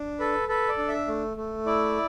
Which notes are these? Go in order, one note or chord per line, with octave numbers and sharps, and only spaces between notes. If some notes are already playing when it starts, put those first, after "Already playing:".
Already playing: D4
A4 B4
A4 B4
D5
D4
E5
A3
A3
E4 D5